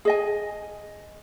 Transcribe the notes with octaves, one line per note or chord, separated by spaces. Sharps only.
G#4 D#5 G#5